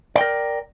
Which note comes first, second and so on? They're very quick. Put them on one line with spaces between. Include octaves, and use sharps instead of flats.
D5 G5 A#4